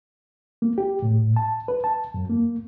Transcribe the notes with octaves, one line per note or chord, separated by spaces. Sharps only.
A#3
G4
A2
A5
B4
A5
F#2
A#3